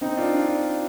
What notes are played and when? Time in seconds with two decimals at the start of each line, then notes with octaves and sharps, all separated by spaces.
0.01 C4 D#4
0.17 D4 F4
0.33 D4 F4